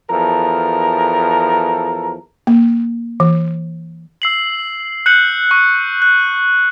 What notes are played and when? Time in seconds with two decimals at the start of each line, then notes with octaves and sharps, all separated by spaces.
0.11 E2 F3 A4 A#4
2.47 A#3
3.20 E3
4.22 E6 C7 F#7
5.06 F#6 G6 C#7 F#7
5.51 C#6
6.02 F#6